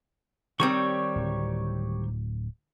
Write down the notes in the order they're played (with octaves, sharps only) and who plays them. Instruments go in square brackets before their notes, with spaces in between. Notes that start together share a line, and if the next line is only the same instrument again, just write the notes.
[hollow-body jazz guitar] D#3 G3 C4 [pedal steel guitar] G4 C#5 C#6
[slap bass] D1